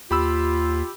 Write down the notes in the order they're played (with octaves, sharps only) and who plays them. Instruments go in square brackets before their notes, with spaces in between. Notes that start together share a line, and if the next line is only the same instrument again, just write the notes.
[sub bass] D#2 [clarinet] F4 [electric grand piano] G4 B5 E6